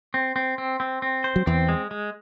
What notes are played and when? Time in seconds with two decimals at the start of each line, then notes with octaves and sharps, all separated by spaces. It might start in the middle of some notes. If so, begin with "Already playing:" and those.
0.14 C4
0.36 C4
0.58 C4
0.80 C4
1.02 C4
1.24 C5
1.36 F#3
1.46 E2 E3 C4
1.69 G#3
1.91 G#3